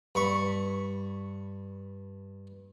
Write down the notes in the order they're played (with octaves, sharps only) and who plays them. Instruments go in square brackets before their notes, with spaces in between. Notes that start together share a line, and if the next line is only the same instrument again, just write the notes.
[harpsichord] G2 B5 C#6